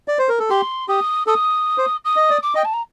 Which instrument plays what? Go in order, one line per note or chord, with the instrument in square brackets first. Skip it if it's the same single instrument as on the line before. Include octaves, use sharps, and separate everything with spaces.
[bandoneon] D5
C5
A#4
A4
[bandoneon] G4 [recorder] C6
[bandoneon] G4 [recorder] D#6
[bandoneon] A4 [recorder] D#6
[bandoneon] C5
[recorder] D#6
[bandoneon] D#5
D5
[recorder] D6
[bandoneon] D#5 [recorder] G5
[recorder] A5
A#5